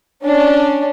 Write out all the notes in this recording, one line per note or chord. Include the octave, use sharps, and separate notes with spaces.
C#4 D4